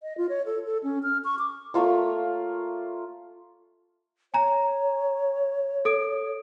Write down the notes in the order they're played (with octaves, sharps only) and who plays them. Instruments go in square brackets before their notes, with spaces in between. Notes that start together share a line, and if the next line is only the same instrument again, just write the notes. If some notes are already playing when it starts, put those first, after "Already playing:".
[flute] D#5
F4
C#5
A4
A4
C#4
F6
C#6
D6
[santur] A3 A#3 F4 C#5
[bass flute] C#5 [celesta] G#5 A#5
[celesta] A4 D#6 D7